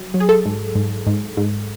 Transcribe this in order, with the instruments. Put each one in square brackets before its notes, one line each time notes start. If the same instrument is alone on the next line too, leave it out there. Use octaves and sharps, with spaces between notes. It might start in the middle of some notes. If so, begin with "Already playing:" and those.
Already playing: [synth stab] F#3
F#3
G#4
A4
G#2
G#2
G#2
G#2